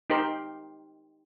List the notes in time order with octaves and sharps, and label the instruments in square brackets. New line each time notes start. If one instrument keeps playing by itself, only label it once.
[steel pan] D#4 G4 A#4 C5